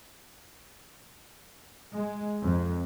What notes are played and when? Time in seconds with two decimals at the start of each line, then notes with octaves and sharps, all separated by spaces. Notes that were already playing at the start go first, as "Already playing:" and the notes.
1.94 G#3
2.43 F2